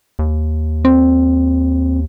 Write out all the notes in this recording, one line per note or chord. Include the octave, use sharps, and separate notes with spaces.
D#2
C4